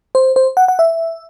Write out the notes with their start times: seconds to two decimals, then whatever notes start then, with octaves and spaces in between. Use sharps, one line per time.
0.15 C5
0.36 C5
0.57 F#5
0.68 F#5
0.79 E5